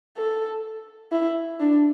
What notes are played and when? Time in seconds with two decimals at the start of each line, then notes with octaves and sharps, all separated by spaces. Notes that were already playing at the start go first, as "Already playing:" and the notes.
0.17 A4
1.12 E4
1.60 D4